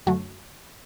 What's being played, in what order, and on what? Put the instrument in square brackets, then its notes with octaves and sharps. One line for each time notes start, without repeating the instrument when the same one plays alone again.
[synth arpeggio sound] F#2 D3 F#3 A3 F#4